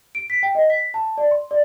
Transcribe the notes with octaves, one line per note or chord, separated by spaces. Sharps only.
D7
B6
G5
D#5
B6
A5
D5
C6
D5